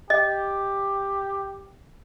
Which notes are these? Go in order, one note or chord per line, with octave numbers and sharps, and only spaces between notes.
G4 D#5